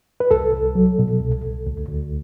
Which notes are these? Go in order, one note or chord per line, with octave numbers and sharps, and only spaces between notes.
B4
C2 A4
C2
F#3
B2
C2
C2
D2
D2